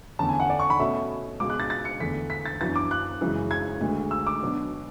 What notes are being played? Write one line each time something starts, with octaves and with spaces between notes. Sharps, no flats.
E2 D3 A3 C#4 A5
G#5
F#5
D5
C#6
B5
B2 A3 C#4 E5
C#2 B2 G#3 D6
F#6
A6
A6
C#7
E2 D3 A3 D4 B6
B6
A6
F#2 E3 B3 D4 A6
D6
F#6
F#2 C#3 E3 G#3
G#6
D2 D3 G#3
E6
D6
B2 F#3 B3 D4